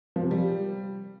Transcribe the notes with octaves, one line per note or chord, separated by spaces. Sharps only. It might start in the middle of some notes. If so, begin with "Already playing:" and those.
F3
C3
G3